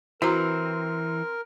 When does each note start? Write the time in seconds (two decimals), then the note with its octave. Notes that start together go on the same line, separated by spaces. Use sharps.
0.22 E3 C4 E4 F#4 A#4 A#5